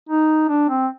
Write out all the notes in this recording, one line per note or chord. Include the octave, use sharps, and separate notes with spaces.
D#4
D4
C4